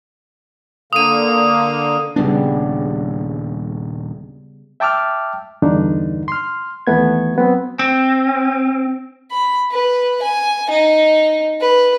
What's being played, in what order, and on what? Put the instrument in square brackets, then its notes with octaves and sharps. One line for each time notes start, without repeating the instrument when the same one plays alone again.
[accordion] D3 A#3 [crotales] D#6 D#7
[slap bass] D#1 D4 [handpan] C#3 G3 B3
[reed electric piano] E5 G5 A5 D6 E6 F6
E2 G2 D3 D4 D#4
C6 F6
D#2 E3 A3 B3 G#6
F#3 B3 C4
[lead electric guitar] C4
[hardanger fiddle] B5
B4
G#5
D#4
B4